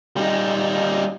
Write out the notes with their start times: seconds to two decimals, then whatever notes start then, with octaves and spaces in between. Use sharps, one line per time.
0.16 G3 D#4